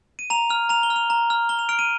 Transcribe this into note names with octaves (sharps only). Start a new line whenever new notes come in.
D#7
A#5 F7
F6 F7
A#5 F7
G7
F6
F7
A#5
F6
A#5 G7
F7
F6 D7
D#7